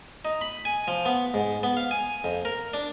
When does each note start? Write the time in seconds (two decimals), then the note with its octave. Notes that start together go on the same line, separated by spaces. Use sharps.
0.25 D#4
0.41 B5
0.65 G#5
0.88 F3
1.06 B3
1.34 G#2
1.63 B3
1.77 F5
1.91 G#5
2.24 F2
2.45 A#4
2.74 D4